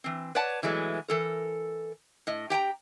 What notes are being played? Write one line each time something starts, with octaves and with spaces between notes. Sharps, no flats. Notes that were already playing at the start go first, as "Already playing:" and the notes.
E3 C4
B4 C#5 D5 F#5 A5
B2 E3 F#3 G#3 A3
E3 A4 A#4
A2 D#5
G4 G5 G#5 A#5